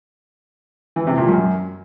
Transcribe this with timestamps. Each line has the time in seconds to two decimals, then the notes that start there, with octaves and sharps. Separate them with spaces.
0.96 E3
1.07 C3
1.18 A#2
1.28 F#2